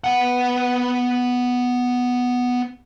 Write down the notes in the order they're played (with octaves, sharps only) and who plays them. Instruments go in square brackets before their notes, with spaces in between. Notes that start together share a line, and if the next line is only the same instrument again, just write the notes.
[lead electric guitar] B3 F#5